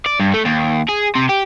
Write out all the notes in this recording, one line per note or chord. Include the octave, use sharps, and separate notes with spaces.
D5
G2
A3
D#2
G#4
C3
G4